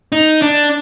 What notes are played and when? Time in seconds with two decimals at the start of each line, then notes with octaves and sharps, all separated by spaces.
0.12 D#4
0.42 D4